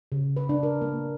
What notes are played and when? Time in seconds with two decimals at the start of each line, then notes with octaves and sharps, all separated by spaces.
0.12 C#3
0.37 B4
0.49 D4
0.63 A#4
0.81 A#3